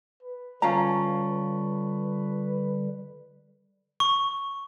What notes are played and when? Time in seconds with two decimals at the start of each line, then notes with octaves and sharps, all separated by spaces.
0.23 B4
0.62 D3 G3 C#4 F4 F5 A5 A#5 C#6
4.00 C#6